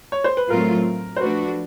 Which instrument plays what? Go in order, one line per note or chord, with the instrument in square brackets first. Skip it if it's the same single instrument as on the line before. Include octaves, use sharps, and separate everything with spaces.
[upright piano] C#5
C5
B4
[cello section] A2 F#3 A3 C4 F4 [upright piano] A#4
[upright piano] C5
[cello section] F3 A3 D4 F#4 [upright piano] B4